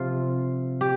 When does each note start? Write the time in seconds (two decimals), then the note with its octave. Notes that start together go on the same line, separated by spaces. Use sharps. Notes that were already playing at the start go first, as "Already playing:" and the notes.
Already playing: C3 F3 F4
0.81 G4